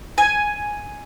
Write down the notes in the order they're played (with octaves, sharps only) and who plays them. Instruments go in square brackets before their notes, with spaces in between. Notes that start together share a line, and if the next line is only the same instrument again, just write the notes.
[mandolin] G#5